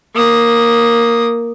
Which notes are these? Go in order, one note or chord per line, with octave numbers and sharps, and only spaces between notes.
A#3 D#6